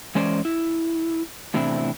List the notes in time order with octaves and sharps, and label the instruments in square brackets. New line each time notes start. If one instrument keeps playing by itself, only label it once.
[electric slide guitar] E3 G#3 C#4 C5 D5
E4
E2 A2 C3 C4 D4 E4